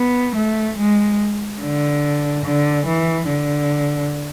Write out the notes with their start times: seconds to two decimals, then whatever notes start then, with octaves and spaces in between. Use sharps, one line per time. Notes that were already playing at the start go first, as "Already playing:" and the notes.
Already playing: B3
0.36 A3
0.78 G#3
1.61 D3
2.45 D3
2.87 E3
3.28 D3